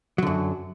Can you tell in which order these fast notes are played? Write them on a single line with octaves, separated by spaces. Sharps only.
F#3 D3 F#2